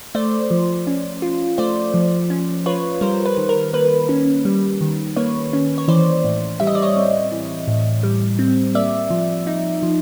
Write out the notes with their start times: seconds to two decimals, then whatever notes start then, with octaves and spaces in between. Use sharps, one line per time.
0.15 A3 C5 D5
0.51 F3
0.87 C#4
1.22 F4
1.58 A3 C5 D5
1.94 F3
2.30 C#4
2.66 F4 B4 C#5
3.01 G3 A#4 C5
3.25 B4
3.37 D#3
3.49 A#4
3.73 A#3 B4
4.09 C#4
4.45 G3
4.81 D#3
5.16 A#3 B4 C#5
5.53 C#4
5.78 C#5
5.88 E3 C5 D5
6.24 A2
6.60 G3 E5
6.67 D#5
6.75 D5
6.82 C#5 D#5
6.96 C4
7.32 E3
7.68 A2
8.03 G3
8.39 C4
8.75 A#3 D5 E5
9.10 F3
9.47 D#4
9.83 F3